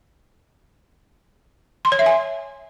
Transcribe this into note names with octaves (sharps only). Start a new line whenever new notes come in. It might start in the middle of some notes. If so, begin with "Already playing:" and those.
C6
C#5
E5
G#5